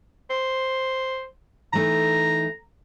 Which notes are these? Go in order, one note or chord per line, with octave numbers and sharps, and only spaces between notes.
C5
E3 A3 D#4 A#5